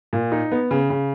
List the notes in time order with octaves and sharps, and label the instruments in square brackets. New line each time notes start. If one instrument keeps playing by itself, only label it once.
[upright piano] A#2
D#4
B3
C#3
C#3